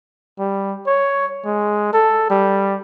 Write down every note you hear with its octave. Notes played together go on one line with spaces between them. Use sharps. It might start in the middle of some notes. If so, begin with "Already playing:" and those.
G3
C#5
G#3
A4
G3